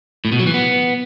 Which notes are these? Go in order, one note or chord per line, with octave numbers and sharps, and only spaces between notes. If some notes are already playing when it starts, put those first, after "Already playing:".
A2
B2
F#3
E3
B3